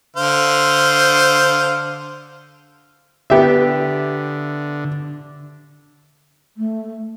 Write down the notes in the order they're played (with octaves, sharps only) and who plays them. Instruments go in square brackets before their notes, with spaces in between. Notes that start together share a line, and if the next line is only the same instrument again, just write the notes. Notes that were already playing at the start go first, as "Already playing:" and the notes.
[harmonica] D3 C5 F5
[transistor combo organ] D3 [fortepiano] B3 G4 E5
[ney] A3